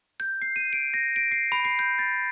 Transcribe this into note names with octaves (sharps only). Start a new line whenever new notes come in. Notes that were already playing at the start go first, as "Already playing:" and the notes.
G6
C7
D#7
D7
A#6
D7
C7
B5
C7
G6
A6